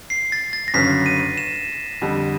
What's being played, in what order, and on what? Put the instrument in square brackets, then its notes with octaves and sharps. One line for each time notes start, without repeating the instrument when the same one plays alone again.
[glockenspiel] C7
A6
A6
A#6
[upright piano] G1 F#2 C#3 F#3 [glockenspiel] B6
[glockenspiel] D#7
E7
[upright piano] F2 D3 G3